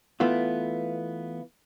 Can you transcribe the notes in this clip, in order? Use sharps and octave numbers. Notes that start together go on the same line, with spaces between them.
E3 A3 B3 F4